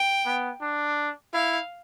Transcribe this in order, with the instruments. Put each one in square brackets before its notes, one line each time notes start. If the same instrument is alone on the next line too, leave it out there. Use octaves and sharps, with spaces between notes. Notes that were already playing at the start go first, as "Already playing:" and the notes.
Already playing: [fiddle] G5
[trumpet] B3
D4
[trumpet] E4 [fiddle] F5